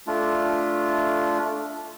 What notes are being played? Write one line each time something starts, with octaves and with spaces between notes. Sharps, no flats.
A3 D4 F4